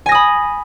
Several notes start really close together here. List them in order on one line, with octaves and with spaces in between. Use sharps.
G#5 A#6 D#6 B5